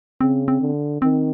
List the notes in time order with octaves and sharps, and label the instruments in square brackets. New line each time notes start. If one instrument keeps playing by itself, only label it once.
[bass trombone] C#3 [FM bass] C4
[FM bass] C4
[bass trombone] D3
[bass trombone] D#3 [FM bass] C4